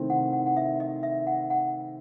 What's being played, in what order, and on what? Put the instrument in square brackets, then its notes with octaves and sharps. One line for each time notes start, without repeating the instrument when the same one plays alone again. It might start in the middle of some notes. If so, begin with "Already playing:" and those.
Already playing: [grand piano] C3 D#3 A3 C4 E4
[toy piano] F#5
F#5
F#5
E5
D#5
E5
F#5
F#5